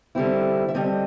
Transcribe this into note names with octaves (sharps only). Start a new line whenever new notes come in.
D3 G3 C4 E4
E5
D3 G3 C4 E4 D#5